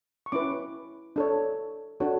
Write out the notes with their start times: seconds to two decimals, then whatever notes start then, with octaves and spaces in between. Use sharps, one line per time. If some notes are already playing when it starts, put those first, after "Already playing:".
0.26 C#6
0.32 C#4 E4 B4 D6
1.16 D4 A4 C#5
2.00 D4 F#4 A4 C#5